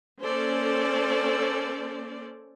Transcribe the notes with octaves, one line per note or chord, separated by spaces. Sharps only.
A#3 C#4 A4 C5 D5